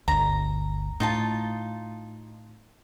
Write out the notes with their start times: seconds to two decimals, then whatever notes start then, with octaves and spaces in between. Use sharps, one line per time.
0.08 G1 D2 A#5
1.00 A2 D#4 F4 A5